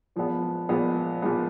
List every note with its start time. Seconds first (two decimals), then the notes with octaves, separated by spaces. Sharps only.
0.16 A#2 F3 G#3 B3
0.69 A#2 F3 G#3 B3
1.22 A#2 F3 G#3 B3